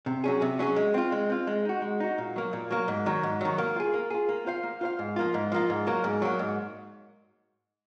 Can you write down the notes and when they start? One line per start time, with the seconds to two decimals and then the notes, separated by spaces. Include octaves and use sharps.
0.06 C3
0.24 F#3 C#4 G#4
0.42 C3
0.59 F#3 C#4 G#4
0.76 G#3
0.94 C4 F4
1.12 G#3
1.29 C4 F4
1.47 G#3
1.65 D#4 F#4
1.82 G#3
2.00 D#4 F#4
2.18 A#2
2.36 F#3 A#3
2.53 A#2
2.71 F#3 A#3
2.88 G#2
3.06 D#3 F#3
3.23 G#2
3.41 D#3 F#3
3.58 A#3
3.76 F4 G#4
3.94 A#3
4.10 F4 G#4
4.29 A#3
4.46 F4 C5 F5
4.64 A#3
4.81 F4 C5 F5
4.99 G#2
5.16 F3 A#3 F4
5.34 G#2
5.52 F3 A#3 F4
5.70 G#2
5.87 F#3 A#3
6.04 G#2
6.22 F#3 A#3
6.39 G#2